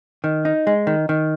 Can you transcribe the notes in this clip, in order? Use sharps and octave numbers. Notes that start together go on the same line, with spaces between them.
D#3
D#4
G#3
D#3
D#3